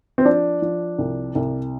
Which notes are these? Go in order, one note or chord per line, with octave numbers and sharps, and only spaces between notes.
C4
F3 D4
F3
C2
C2